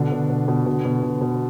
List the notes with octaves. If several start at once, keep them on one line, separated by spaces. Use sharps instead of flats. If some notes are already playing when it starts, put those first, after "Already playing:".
Already playing: B2 D3 D4
B2
B2
B2
B2
B2
B2
B2